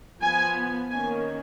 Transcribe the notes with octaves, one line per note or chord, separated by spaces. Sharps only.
F3 B3 G#5
D#3 A#3 C#4 G#5